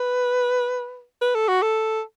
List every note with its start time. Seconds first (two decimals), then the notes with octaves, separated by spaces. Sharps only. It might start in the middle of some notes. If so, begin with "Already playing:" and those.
Already playing: B4
1.21 B4
1.35 A4
1.48 F#4
1.62 A4